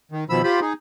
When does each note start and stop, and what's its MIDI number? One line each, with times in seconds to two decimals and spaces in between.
0.12 0.24 51
0.30 0.42 47
0.30 0.42 51
0.30 0.42 53
0.30 0.42 83
0.30 0.42 88
0.44 0.60 65
0.44 0.60 67
0.44 0.60 72
0.44 0.60 83
0.61 0.73 63
0.61 0.73 68